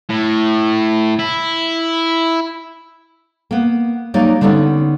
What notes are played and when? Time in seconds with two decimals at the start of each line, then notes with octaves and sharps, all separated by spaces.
0.09 A2
1.19 E4
3.51 A#3 B3
4.14 F#3 G3 A#3 D#4 D5
4.41 D3 G3 B3 C#4 D#4